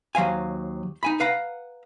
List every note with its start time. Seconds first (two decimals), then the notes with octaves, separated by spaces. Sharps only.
0.15 D#2 F#3 C5 F5 G#5
1.03 D#4 G#5 B5
1.20 B4 F5 F#5 A#5